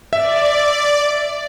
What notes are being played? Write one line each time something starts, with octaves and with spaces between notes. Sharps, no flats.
D5 E5